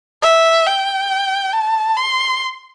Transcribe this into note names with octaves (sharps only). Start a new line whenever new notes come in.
E5
G5
A5
C6